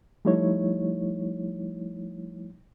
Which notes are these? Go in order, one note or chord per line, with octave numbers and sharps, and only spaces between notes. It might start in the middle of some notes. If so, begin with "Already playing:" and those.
F3 G3 A3 D#4 E4 C#5